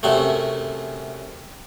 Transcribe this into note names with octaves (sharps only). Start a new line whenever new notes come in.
F#2 C3 A3